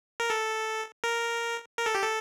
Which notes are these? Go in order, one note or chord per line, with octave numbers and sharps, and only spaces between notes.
A#4
A4
A#4
A#4
A4
G4
A4